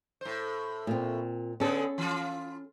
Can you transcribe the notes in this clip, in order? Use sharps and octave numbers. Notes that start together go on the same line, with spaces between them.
A2 C5
A#2 C4
D3 B3 C#4 G#4 A4
E3 F4